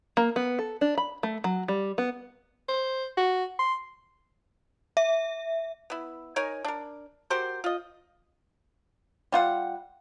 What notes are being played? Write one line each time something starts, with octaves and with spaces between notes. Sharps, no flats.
A#3
B3
A4
D4
B5
A3
F#3
G3
B3
C5
F#4
C6
E5
B3 E4
D#4 A#4 C#5 G#5
D4 A#4
F#4 G4 A#4 C5
F4 D#5
G3 F4 F#5